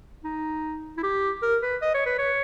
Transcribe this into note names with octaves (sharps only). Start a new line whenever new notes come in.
D#4
E4
G4
A#4
B4
D#5
C#5
B4
C#5